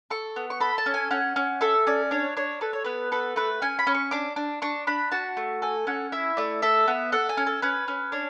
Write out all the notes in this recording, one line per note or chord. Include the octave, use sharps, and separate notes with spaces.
A4 C#6
B3
C#6
A4 B5
A5
C#4
G#5
C#4 F#5
C#4
A4 E5
C#4 D5
D4 C#5
D4 C#5
A4 B4
C#5
B3 B4
A4 B4
A3 B4
C#4 G#5
B5
C#4
C#6
D4 D6
D4
D4 C#6
D4 B5
F#4 A5
A3
A4 G#5
C#4 F#5
E4 E5
A3 D5
A4 E5
B3
A4 F#5
G#5
C#4
A4
C#4 B4
C#4
D4 C#5